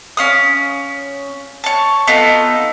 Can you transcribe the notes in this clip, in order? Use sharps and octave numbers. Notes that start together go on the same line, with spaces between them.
C#4 F5 D#6
C#5 A5
B3 D#4 F4 A4